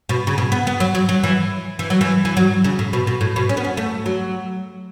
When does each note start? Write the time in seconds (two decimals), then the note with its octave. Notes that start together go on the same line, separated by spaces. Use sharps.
0.09 B2
0.27 C#3
0.38 B2
0.52 B3
0.67 B3
0.80 F#3
0.95 F#3
1.09 F#3
1.24 E3
1.79 E3
1.90 F#3
2.01 E3
2.25 E3
2.37 F#3
2.64 C#3
2.79 A2
2.93 B2
3.07 B2
3.21 A2
3.36 B2
3.49 C#4
3.57 B3
3.64 C#4
3.77 A3
4.06 F#3